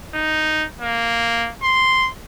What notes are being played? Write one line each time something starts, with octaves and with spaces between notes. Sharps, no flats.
D#4
A#3
C6